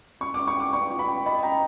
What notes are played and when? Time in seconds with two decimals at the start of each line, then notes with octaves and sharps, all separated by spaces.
0.21 F4 C#6
0.34 D6
0.38 G5
0.47 C#6
0.57 G5 D6
0.73 D5 C#6
0.91 F4
0.99 B5
1.08 G5
1.26 D#5 B5
1.43 G5 A#5